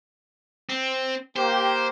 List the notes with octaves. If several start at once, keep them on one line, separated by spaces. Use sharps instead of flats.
C4
A#3 G4 C5